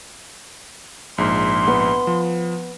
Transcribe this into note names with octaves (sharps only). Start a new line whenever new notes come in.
A#1 G#2 C6
B3
F3